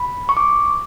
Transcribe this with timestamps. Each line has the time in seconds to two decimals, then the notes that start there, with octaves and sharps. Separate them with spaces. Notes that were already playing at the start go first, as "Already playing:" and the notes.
Already playing: B5
0.29 C#6
0.37 D6